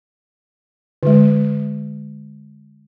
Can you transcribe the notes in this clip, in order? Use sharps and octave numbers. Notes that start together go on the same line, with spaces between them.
D3 G#3